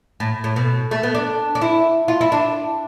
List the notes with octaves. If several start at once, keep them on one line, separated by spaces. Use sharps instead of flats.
A2
A2
B2
A3
B3
D4
D4
E4
F4
E4
D4